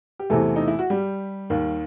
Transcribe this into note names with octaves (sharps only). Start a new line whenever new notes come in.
G4
E2 C3 E3 A3 A4
D#4
E4
F#4
G3 G4
D#2 D#3